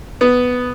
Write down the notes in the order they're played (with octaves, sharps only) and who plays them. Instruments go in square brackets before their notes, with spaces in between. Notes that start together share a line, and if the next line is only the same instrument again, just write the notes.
[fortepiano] B3